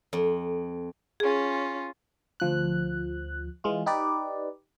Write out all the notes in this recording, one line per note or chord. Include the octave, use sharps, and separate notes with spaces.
F2
C#4 F4 G#4
D2 F3 F#6
E3 G#3 F4
D#4 G4 B4 D5